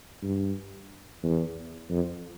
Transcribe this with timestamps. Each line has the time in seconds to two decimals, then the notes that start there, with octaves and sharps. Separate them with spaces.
0.22 G2
1.23 E2
1.90 F2